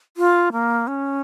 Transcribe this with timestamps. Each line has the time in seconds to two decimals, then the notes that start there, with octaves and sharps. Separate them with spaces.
0.17 F4
0.53 A#3
0.87 C#4